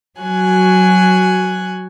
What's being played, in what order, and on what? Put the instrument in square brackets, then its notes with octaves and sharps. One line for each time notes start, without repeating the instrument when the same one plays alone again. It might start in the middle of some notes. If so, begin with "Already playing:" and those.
[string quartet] F#3 F#4 G#5 F#6